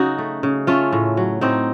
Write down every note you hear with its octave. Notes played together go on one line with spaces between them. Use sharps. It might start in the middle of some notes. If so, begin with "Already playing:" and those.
Already playing: C#3 F#3 D#4 F#4
A3
C#3
A3 C#4 F4
A2
F#3
A2 C4 D#4